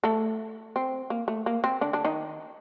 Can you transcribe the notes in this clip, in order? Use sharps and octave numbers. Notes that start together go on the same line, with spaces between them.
A3 A4
C4
A#3
A3
A#3
C4
D3 D4
D3 D4
D#3 D#4